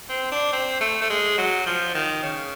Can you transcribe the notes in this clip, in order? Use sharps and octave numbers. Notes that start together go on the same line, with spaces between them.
C4
D4
C4
A3
A3
G#3
F#3
F3
D#3
C#3